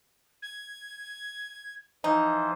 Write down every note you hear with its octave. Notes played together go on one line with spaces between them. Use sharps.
G#6
E3 F3 D#4 C5